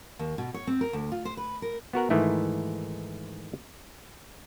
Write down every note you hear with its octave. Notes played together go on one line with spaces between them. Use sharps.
D#2
B2
C#5
C4
A#4
D2
F4
C5
B4
A#4
B3 F#4 A#4 F#5
G#2 D#3 E3 A3 E4